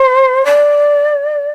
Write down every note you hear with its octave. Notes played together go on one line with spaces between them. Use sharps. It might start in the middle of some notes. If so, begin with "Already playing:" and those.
Already playing: C5
D5